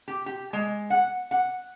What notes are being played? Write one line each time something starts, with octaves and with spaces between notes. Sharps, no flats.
G4
G4
G#3
F#5
F#5